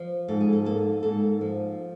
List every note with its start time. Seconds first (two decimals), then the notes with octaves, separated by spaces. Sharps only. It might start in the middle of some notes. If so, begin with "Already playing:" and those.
Already playing: F3
0.28 G#2 A4
0.40 G#4
0.53 A4
0.65 A#3 A4
1.03 G#2 A4
1.41 F3